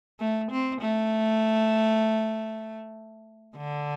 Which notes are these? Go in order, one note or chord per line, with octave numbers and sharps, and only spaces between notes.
A3
C4
A3
D3